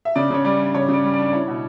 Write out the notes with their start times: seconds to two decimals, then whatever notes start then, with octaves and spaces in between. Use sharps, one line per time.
0.05 E5
0.15 C#3 D5
0.30 C#3 C#5
0.44 G3 D5
0.59 D4
0.74 C#3 C#5
0.89 C#3 D5
1.04 G3
1.13 D5
1.19 D4
1.27 D5
1.33 E4 C#5
1.48 B2